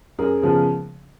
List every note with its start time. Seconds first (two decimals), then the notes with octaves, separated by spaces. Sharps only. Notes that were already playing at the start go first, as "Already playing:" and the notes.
0.19 F#2 G#4 A#4
0.42 C#3 F3 G#3 B3